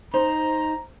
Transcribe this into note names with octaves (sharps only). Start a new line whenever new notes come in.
D#4 C5 A#5